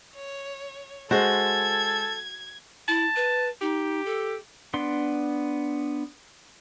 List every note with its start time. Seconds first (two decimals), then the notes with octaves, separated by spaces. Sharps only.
0.15 C#5
1.11 G#3 F#4 A4 C5 G#6
2.88 E4 A5
3.16 B4
3.61 D#4 G4
4.06 A4
4.74 B3 D4 C6